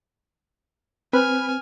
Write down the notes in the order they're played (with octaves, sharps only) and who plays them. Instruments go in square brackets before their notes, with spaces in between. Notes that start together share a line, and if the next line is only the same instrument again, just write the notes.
[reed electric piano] C4 [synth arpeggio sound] B4 [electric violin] G#5 F6